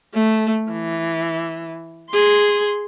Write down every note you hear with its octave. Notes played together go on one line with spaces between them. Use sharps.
A3
E3
G#4 C6